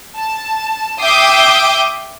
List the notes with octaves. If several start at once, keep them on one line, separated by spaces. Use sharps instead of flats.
A5
E5 G5 D6 D#6 G6 C7